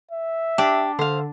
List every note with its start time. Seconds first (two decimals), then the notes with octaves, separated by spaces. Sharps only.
0.11 E5
0.58 D4 G4
0.99 D3 C5 F5